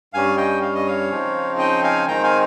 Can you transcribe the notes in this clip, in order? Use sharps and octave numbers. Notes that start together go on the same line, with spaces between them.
G2 G3 C#4 F5 G#5
D#5 G5
F5
D#5
C#5 F5
C#3 F3 C4 D#4
D#5 G5
F5 G#5
D#3 G#3 C4 D#4 G5 A#5
F5 G#5